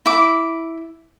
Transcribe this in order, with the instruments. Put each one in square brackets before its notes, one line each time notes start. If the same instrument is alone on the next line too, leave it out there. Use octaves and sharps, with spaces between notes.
[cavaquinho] E4 D6